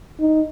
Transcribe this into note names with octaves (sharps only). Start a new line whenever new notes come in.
D#4